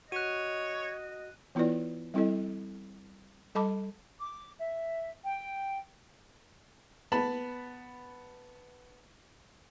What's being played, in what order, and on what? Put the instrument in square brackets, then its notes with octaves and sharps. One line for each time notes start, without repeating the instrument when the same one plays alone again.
[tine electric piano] F#4 [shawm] C#5 [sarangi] D#5 [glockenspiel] F#6 D#7
[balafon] E3 B3 E4 F4 B4 D5
G3 C4 E4 A4 D#5
G3 A4 D#5 A5 B5 D6
[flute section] D6
E5
G5
[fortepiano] B3 A5 B5